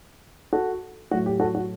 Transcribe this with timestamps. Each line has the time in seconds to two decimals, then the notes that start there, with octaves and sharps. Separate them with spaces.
0.53 F#4 A4
1.11 A2 F#3 A3 F#4
1.26 G4
1.40 F#4 A4
1.55 F#4